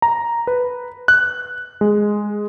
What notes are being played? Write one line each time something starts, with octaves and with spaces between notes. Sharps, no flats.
A#5
B4
F#6
G#3